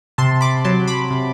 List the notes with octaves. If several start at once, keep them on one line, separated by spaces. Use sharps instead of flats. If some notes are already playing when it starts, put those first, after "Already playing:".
C3 A5 C6
B5 D6
F#3 A5 C6
B5 D6
C3